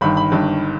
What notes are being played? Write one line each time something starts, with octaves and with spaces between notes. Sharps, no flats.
G1 G2 D#3 B5
B5
G1 G2 D#3